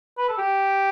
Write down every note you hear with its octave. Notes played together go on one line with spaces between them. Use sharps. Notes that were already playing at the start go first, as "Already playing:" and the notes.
B4
A4
G4